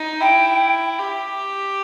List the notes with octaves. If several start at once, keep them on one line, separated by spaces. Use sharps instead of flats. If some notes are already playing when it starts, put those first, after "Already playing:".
Already playing: D#4
E4 G5
G4